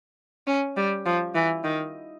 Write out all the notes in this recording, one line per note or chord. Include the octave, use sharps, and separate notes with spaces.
C#4
G3
F3
E3
D#3